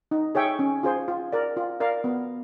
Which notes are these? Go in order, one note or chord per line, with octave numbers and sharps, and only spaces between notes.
D#4
G#4 C#5 E5 G5
C#4
F4 G#4 C5
F4
A#4 D5
F4
A#4 D5 F5
B3